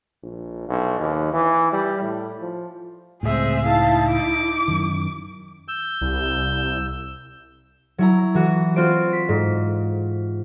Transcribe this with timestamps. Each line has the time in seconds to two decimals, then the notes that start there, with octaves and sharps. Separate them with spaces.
0.23 A#1
0.68 B1
0.99 D#2
1.33 E3
1.72 G3
2.01 A2
2.41 F3
3.23 C#2 A2 G#3 C4 G#4 E5
3.65 D#4 E4 F5 A5
4.10 D6
4.68 F#2 D#3
5.68 E6 G6
6.01 C2
7.98 F#3 E4 A#5
8.34 E3 F#4
8.76 C4 F4 F#4 C5 D7
9.13 B6
9.29 G#2